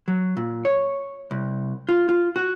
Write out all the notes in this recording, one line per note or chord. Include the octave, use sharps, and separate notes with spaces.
F#3
A#2
C#5
C2
F4
F4
F#4